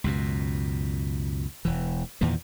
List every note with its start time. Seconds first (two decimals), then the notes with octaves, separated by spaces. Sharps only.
0.04 C#2 F#2 B2
1.65 E1 E3
2.21 E2 A#2 D#3 E3